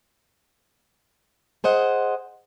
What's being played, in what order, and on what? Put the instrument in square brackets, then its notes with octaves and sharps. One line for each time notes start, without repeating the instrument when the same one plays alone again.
[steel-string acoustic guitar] G#4 C5 D#5 F#5